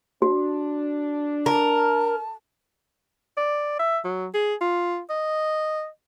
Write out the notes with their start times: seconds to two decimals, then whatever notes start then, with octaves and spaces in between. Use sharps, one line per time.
0.22 D4 F#4
1.46 A#4 A5
3.37 D5
3.79 E5
4.05 F#3
4.34 G#4
4.61 F4
5.10 D#5